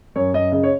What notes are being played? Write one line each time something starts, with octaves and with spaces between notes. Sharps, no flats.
F#2 C#5
F#2 D#5
C#3 D#5
C#5